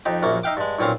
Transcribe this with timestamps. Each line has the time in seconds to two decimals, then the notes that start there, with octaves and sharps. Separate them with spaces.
0.06 F2 D#4 G4
0.23 A#1 F#2 A#3 C#4
0.43 D#4 E5 F5 G5 D6
0.57 G2 G#3
0.79 B1 A#2 C4 C#4 F5